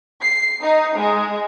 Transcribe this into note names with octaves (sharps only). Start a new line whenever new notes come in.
C7
D#4
G#3